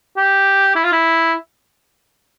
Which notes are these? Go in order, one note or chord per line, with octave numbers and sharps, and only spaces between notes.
G4
E4
F4
E4